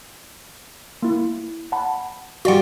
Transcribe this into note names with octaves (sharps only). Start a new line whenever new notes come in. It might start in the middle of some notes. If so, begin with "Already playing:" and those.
A#3 E4
F#5 A5 B5
G3 F4 F#4 D5 F#5